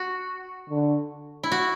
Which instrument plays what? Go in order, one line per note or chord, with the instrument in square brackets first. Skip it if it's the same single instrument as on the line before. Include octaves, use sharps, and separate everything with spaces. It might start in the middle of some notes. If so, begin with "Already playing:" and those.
Already playing: [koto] F#4
[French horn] D3
[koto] E4
F#4